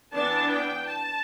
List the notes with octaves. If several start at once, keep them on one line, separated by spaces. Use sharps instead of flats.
E3 B3 D4 A5
G5
A5